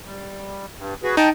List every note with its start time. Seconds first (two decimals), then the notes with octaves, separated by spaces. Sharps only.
0.05 G3
0.77 G2
1.03 F#4 G#4 B4
1.17 D#4 G5 A5